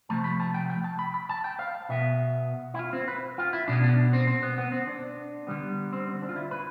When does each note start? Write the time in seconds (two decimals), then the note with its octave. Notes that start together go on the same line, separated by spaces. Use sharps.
0.09 C3 F3 A3 A5
0.24 B5
0.40 A5
0.54 G5
0.70 G5
0.84 A5
0.99 B5
1.14 B5
1.29 A5
1.44 G5
1.59 F5
1.89 B2 B3 E5
2.74 E4
2.79 F4
2.93 C4
3.08 B4
3.38 F4
3.53 E4
3.68 B2 B3 D4
3.84 D4
4.13 C4
4.27 C4
4.43 B3
4.58 B3
4.72 C4
4.87 D4
5.47 D3 G3 B3
5.93 C4
6.07 C4
6.22 D4
6.29 F4
6.36 E4
6.51 B4